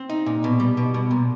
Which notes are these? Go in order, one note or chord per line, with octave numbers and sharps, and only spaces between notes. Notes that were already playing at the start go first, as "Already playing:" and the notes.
Already playing: C4
D#4
A#2
B2
G3
B2
B2
A#2